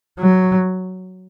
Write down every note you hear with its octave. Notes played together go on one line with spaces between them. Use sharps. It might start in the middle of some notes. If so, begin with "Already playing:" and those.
F#3